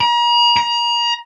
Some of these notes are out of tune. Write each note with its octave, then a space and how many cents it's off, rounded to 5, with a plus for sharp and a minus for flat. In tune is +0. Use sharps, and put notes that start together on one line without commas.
A#5 +40
A#5 +30